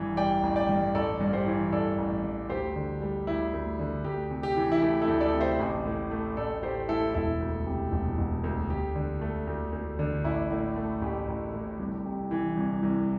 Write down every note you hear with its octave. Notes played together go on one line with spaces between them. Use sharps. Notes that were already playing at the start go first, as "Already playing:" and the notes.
Already playing: A1 G2 E3
G3 D5 G5
A1
D5 G5
G2
A1 A4 D5
G2
G4 C5
E3
A1 A4 D5
A1
G2
D2 G4 C5
D3
G3
D2 E4
D2
D3
D2 G4
C3
G4
E3
E4
A3 G4
E4 A4
D2
A4 D5
C3
C5 E5
A1
A2
A3
A1 A4 D5
A1 G4 C5
A2 E4 A4
E1 E4 A4
D2
C3
E1
E1
D2
D2 G4
D3
A3
D2
D2
D3
A1 E4
A2
A3
A1 G4
A1
A2
C2
C3
E3
C2
C2